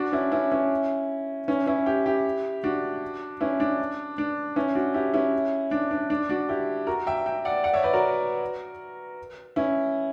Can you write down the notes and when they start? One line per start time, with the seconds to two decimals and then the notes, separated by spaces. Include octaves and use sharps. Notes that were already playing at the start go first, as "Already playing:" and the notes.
Already playing: D4 F#4
0.12 C#4 E4
0.32 C#4 E4
0.52 C#4 E4
1.48 C#4 E4
1.66 C#4 E4
1.86 E4 G4
2.06 E4 G4
2.64 D4 F#4
3.41 C#4 E4
3.60 D4
4.18 D4
4.56 C#4 E4
4.75 D4 F#4
4.94 E4 G4
5.14 C#4 E4
5.71 D4
5.91 D4
6.10 D4
6.29 D4 F#4
6.49 E4 G4
6.87 F#4 A#4
7.07 E5 G5
7.26 E5 G5
7.45 D5 F#5
7.64 D5 F#5
7.74 C#5 E5
7.83 B4 D5
7.93 F#4 A#4
9.56 C#4 E4